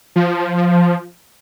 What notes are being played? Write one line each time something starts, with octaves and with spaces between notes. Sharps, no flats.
F3